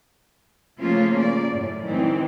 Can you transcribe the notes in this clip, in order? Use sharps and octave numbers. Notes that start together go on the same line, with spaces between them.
C#3 F3 A3 A#3 C#4 F4
D5
F#2 A2
D#3 E3 G#3 C4 D#4